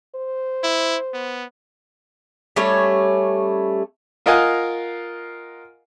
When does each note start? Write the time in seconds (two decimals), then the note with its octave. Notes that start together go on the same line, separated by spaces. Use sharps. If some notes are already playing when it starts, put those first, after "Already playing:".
0.16 C5
0.64 E4
1.14 B3
2.56 G3 A3 C#4 C#5
4.26 F4 A#4 D#5 F5 F#5 G#5